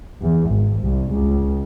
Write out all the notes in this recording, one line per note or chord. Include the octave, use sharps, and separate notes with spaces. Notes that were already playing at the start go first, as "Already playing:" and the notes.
E2
G#1
C2
C#2